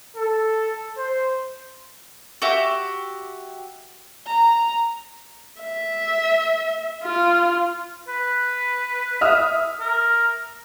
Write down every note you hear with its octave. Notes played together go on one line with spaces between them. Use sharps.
A4
C5
F#4 G4 E5
A#5
E5
F4
B4
E5 D#6 F6
A#4